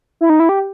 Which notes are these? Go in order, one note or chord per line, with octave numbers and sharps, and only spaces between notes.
E4
D#4
E4
G4